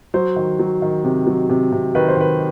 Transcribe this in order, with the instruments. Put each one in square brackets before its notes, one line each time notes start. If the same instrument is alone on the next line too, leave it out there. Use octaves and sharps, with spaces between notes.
[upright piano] F#3 C5
D#3
F#3
D#3
C3
F#3
C3
C3
D#3 B4
C5
D#3 B4